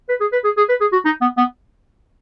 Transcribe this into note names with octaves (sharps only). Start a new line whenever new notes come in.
B4
G#4
B4
G#4
G#4
B4
G#4
F#4
D#4
B3
B3